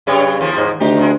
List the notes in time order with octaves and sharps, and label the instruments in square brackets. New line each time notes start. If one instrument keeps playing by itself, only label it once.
[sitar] F#2 G3 C#5 [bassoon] C#3
[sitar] D#2 F3 A#3
[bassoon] G#2
[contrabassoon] D2 [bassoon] D#4 [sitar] G4
[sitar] F2 G#3